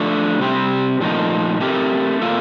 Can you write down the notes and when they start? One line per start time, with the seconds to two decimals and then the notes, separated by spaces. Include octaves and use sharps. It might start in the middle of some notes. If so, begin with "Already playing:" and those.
Already playing: F3 A3 D4
0.39 C3 G3 C4 G4
1.00 A#2 F3 A3 D#4
1.60 A3 C4 G4 A#4
2.22 A#2 F3 A#3 F4 A4